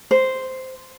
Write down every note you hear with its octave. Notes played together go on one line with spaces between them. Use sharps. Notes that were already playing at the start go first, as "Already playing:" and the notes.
C5